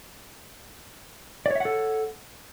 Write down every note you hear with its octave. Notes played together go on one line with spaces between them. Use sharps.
A4 C#5 D5 E5 F#5